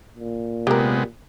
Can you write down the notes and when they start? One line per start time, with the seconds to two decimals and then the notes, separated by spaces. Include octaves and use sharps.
0.15 A#2
0.67 C3 G#3 B3 G4 A#4